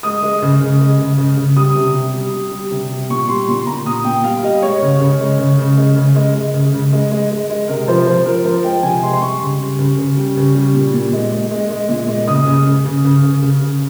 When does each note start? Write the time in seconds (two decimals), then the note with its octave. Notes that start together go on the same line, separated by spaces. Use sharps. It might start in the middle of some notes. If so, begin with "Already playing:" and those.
0.03 G#3 D#6
0.23 G#3
0.42 C#3
0.61 C#3
0.80 G#3
0.99 C#3
1.18 C#3
1.38 C#3
1.56 G3 D#6
1.75 C3
1.94 G3
2.14 G3
2.34 G3
2.52 G3
2.71 C3
2.91 G3
3.10 A#2 C#6
3.29 G3 C6
3.48 A#2 C6
3.62 C6
3.66 A#2 A#5
3.86 A#2 D#6
4.05 A#2 G5
4.24 G3 F5
4.43 G3 D#5
4.62 G#3 C#5
4.82 C#3
5.01 C#3
5.21 G#3
5.39 C#3
5.59 C#3
5.77 G#3
5.96 C#3
6.16 G#3
6.35 G#3
6.54 C#3
6.74 C#3
6.93 G#3
7.12 G#3
7.31 G#3
7.50 G#3
7.68 C3 A#4
7.88 F3 C5
8.07 F3 C5
8.25 F3 A#4
8.45 F3 C5
8.64 G#3 G5
8.83 C3 G#5
9.02 G#3 C6
9.13 C6
9.21 G3 C#6
9.41 C#3
9.59 G3
9.79 C#3
9.99 C#3
10.17 G3
10.37 C#3
10.56 G3
10.74 A#2
10.93 A#2
11.13 G#3
11.32 G#3
11.51 G#3
11.70 G#3
11.89 A#2
12.08 G#3
12.27 C#3 D#6
12.46 C#3
12.66 C#3
12.86 C#3
13.05 C#3
13.23 C#3
13.43 C#3
13.62 C#3